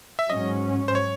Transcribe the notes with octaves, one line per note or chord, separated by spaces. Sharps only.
E5
G#2 F#3 C#4 D#5
C5
C#5